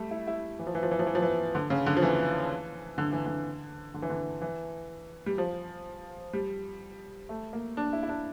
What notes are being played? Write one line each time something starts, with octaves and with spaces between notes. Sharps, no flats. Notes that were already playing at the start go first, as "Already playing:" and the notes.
Already playing: G3 A3
E4
E4
E3
F3
E3
F3
E3
F3
E3
F3
E3
D3
C#3
D3
F3
E3
D3
E3
D3
D3
E3
D3
E3
G3
F3
G3
A3
A#3
D4
E4
E4
D4